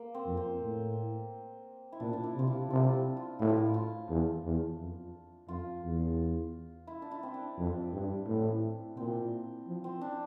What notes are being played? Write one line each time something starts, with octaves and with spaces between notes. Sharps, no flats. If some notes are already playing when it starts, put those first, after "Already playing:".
Already playing: A#3
C4
F2
C4
A2
E4
A#2 D4
D4
E4
C3 F4
E4
C3 F4
F4
E4
F4
A2 E4
F4
E4
F4
E2
E2
F2
F2 F4
E2
E4
D4
E4
C4
D4
F2
G2
A2
A#2 C4
F3
C4
D4